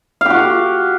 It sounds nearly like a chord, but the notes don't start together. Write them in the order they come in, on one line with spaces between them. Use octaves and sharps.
F5 G4 F#4